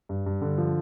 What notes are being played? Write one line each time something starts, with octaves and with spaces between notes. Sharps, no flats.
G2
G2
D3
F3